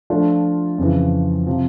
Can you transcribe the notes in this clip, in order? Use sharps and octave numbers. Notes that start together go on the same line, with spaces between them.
F3 A3 D4 F4
F2 C#3 E3
C3 F3